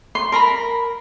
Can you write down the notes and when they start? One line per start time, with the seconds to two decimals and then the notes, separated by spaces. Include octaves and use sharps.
0.15 C6
0.32 A#4 A#5 B5